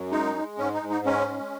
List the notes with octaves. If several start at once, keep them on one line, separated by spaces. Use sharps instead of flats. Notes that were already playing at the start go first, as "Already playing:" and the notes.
Already playing: F#2
G#3 D#4
G#3
G#2 C#4
D#4
G#2
D#4
G#3 C#4
G#3